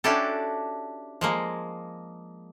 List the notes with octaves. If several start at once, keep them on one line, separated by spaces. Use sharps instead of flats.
C#4 D4 E4 F#4 G4 A4
F3 G#3 A#3